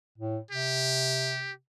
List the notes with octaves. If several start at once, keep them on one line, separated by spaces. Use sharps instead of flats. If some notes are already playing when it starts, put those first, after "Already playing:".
A2
C3 G4